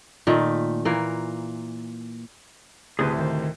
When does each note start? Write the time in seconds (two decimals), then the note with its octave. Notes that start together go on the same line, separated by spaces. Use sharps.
0.27 A#2 D#3 A3
0.85 A#2 E3 A#3
2.99 D2 A2 C3 G#4 A4 B4
3.18 D#3 C5